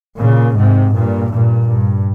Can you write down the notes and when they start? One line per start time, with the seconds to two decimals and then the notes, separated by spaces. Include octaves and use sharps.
0.19 A#2 C#3
0.57 G#2 C3
0.94 G2 A#2
1.31 G2 A#2
1.69 G2